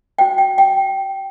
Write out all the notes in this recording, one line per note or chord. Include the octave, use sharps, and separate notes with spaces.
F#4 C5 G5
G5
G5